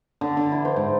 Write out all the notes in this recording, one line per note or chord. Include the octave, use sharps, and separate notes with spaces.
D3
D3
E4
C5
G#2